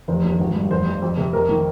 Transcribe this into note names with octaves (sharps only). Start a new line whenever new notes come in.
F1 C5
D#2
G#1
G2
F1 C5
F2
F2
C3
F2 A#4
D#3